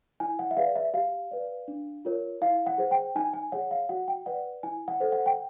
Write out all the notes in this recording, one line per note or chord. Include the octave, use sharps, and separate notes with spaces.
E4 G#5
F#5
E5
G#4 B4 D5 F5
E5
G4 F5
B4 D5
D4
F4 A#4 C#5
E4 F5
F#5
G#4 C5
G5
D#4 G#5
G#5
G#4 C#5 F#5
F5
F#4 F#5
G5
B4 D5 F#5
E4 G#5
F#5
A4 C5
F#5
G5